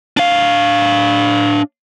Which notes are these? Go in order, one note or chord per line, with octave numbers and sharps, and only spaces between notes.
D4 F5